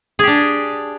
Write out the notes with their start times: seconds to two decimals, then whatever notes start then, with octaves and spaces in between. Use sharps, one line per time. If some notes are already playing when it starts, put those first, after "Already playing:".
0.19 G#4
0.23 G4
0.27 D4